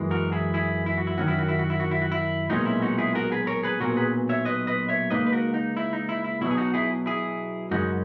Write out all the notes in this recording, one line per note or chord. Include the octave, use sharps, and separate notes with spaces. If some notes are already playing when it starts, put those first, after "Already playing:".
Already playing: F#2 E3 G#3
F#4 A#4
E4 G#4
E4 G#4
E4
F#4
E4
F#2 D#3 F#3 C#4 F#4
E4
F#4
E4
F#4
E4
F#4
E4
F#4
E4
B1 A#2 G#3 C#4 D#4 F#4
E4
D#4 F#4
E4 G#4
F#4 A#4
G#4 B4
A#4 C#5
G#4 B4
B1 A#2 F#3 F#4 A#4
G#4 B4
C#5 E5
B4 D#5
B4 D#5
C#5 E5
C#2 B2 A#3 D#4 B4 D#5
B4
F#4 A#4
D#4
E4
D#4
E4
E4
B2 F#3 B3 E4
G#4
D#4 F#4
E4 G#4
E4 G#4
F#2 C#3 G#3 C#4 D#4 F#4